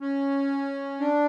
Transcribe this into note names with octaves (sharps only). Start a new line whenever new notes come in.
C#4
D4